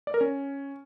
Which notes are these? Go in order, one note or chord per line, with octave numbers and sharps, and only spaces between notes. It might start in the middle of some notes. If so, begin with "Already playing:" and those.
D5
A#4
C#4